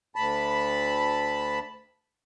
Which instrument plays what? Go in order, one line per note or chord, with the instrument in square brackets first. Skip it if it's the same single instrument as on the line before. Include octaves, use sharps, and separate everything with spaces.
[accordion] D2 A5 B5